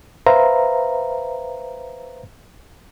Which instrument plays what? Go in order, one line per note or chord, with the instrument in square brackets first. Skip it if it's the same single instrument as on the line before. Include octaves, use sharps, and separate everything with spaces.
[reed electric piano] B4 C5 E5 F5 A#5